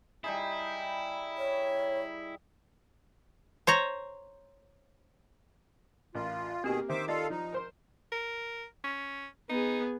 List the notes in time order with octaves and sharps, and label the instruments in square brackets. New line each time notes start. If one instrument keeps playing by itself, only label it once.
[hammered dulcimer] G3 D#4 G#4 [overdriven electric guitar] E4
[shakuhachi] C#5
[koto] C5 C#5 A#5
[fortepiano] A1 A#4 [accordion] F4
[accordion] B2 D#3 G#4 [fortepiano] A#3 [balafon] C4 G4
[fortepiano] D#3 [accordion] C5 E5 D6
[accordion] F4 A4 F5 [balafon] D5 D#5
[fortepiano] F3 [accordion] D#4
[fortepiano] A#4 C5 C6
[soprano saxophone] A#4
C#4
[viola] B3 G#4 [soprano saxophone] D#4